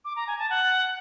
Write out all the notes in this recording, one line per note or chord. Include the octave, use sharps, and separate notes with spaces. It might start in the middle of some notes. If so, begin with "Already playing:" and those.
D6
A#5
G#5
A5
F#5